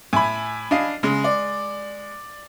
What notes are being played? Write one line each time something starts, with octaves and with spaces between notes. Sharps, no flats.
A2 G#5 B5
D4 D#5 F5
C#3 G#3
D5